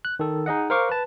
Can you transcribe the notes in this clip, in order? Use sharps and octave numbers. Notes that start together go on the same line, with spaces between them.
F#6
D#3 A4
D#4 G#4 D#5 F#5
A#4 C5 F5 C#6 D6 F6
B4 A5